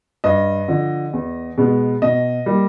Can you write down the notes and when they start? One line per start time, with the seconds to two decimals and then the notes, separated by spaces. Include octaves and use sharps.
0.24 G2 D#5
0.68 D3 F3
1.13 E2
1.58 B2 G#3 B3
2.02 B2 D#5
2.46 G3 A#3